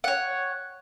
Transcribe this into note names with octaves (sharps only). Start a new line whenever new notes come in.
C#5 F#5